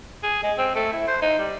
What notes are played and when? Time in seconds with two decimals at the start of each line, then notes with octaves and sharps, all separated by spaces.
0.23 G#4
0.43 G#3
0.58 C4
0.75 A3
0.92 E4
1.08 C5
1.22 D#4
1.39 G3